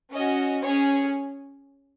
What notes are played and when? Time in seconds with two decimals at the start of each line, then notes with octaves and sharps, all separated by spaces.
0.12 C#4 F#4 D#5
0.63 C#4 G#4 C#5